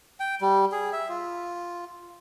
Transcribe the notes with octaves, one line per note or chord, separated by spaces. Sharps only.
G5
G3
G#4
E5
F4